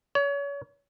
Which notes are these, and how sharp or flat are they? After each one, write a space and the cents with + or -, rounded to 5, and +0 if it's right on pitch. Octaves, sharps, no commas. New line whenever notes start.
C#5 +35